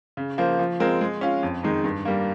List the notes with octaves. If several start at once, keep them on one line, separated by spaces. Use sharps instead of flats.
C#3
F3 A#3 F4 C5
F3
G#3 C4 F4 A#4
G#3
C#4 F4
F2
D#3 G#3 D#4
G2
G3 A#3